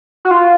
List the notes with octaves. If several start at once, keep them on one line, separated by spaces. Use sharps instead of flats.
F#4
F4